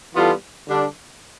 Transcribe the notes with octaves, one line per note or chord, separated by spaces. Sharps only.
E3 G3 B3 F4 A4
D3 G3 D4